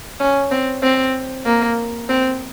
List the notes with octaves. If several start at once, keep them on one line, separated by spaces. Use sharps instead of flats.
C#4
C4
C4
A#3
C4